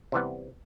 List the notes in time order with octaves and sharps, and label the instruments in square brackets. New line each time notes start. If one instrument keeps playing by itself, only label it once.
[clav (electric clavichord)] C3 E3 G3 B3